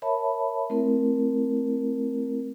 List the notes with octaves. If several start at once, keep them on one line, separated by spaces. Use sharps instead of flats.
A#4 C#5 E5 A5 B5
A3 C4 E4 A#4